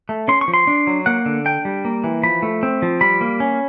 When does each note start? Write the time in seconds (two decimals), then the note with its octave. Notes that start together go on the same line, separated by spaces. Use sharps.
0.09 A3
0.28 C#4 C6
0.41 C#6
0.48 F3
0.54 C6
0.67 D4
0.87 F#3
1.06 A#3 F#5
1.26 D3
1.45 D4 G5
1.65 G3
1.85 A#3
2.04 E3
2.23 F3 B5
2.43 A3
2.63 C4
2.82 F3
3.01 G3 B5
3.21 A#3
3.40 C#4